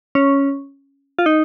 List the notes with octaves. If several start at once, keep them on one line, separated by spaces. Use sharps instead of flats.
C#4
F4
D#4